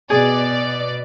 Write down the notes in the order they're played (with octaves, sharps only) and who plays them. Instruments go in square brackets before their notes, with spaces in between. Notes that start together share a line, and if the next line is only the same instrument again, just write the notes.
[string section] B2 D5 [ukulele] G#4